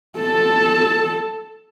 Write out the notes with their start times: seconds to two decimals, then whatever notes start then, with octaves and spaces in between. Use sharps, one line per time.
0.18 A4 A5